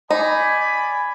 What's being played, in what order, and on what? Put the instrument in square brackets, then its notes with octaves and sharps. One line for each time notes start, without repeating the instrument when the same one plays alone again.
[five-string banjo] D#4 [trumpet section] D5 G#5 B5